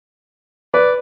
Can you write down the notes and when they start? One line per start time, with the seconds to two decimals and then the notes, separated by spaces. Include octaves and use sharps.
0.74 B4 D5